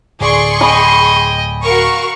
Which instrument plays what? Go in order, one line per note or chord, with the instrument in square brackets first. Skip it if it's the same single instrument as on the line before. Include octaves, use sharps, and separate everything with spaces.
[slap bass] D1 D3 [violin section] G#4 C6 C#6 [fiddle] D5
[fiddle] D#5 G5 [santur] G#5 B5 D6
[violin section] F#4 F5 C#6 [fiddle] A#4